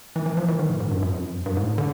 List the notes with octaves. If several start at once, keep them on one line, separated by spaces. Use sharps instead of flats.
E3
E3
F3
E3
D#3
A2
G#2
G2
F#2
F2
G2
G#2
A2
D3